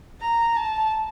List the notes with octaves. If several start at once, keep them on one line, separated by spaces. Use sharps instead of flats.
A#5
A5